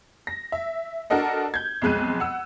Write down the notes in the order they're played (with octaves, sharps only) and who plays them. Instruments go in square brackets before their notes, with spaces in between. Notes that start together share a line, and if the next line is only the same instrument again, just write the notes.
[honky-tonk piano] A#6
E5
D4 F#4 A4 A#4 D#5 F#5
G6 G#6
B1 F2 G#3 F#6 D#7
F#5 E6